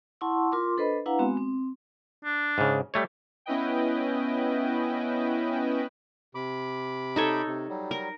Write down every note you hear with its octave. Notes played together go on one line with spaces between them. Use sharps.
E4 F#5 A5 C6 C#6 E6
F4 A#4 C6 D6
D4 A4 B4 C5 D#5 B5
D4 E4 B4 F5 F#5 A#5
G#3 B3 C4 F#4
C4
D4
G#2 C#3
G3 A3 C#5
B3 C#4 E4 B4 D#5 G5
C3 B5 D6
D#4 A4 C#5
C3
F#3 G3
A#4